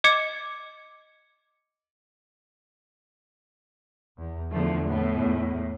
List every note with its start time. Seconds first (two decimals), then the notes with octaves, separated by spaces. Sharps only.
0.04 D#5 D6 G#6 C#7
4.18 E2
4.52 E2 D3 F3 A3
4.88 A2 B3
5.20 E2